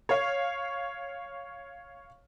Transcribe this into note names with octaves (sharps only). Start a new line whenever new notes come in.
C#5 F5